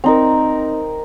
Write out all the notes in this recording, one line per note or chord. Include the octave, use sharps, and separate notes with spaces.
C4 D#4 A#4